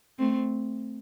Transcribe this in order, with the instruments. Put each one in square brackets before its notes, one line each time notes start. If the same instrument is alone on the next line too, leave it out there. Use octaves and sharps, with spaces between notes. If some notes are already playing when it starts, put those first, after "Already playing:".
[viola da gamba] A3 C4